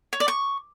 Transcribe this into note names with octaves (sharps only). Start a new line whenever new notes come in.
C#5
D5
C#6